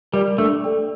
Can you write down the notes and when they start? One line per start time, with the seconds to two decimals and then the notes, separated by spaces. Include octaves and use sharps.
0.13 G3 A#4 D5
0.38 A3 D4
0.64 A4 D5 G5